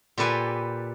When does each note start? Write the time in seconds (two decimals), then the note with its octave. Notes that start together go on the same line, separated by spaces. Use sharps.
0.18 A#2 G4 A4 B4 G5 G#5